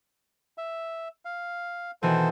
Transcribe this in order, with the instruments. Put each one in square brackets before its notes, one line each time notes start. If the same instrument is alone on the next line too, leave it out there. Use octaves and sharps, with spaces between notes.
[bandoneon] E5
F5
[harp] B2 D#3 E3 [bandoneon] A4 C5